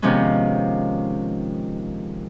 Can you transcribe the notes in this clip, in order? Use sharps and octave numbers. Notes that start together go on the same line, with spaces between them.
C3 D#3 F3 G#3 B3 C#4